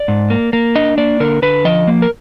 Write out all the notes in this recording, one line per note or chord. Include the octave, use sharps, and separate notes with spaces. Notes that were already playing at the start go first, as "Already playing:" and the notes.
Already playing: D5
G#2
A#3
A#3
D4 D#5
A#3 D5
D3 A#4
D3 B4
F3 D#5
A#3
A#4